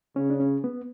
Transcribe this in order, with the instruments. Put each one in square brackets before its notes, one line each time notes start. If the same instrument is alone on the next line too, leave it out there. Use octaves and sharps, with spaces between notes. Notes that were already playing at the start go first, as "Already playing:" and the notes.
[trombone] C#3 [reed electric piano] C#4
[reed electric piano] D4
C#4
B3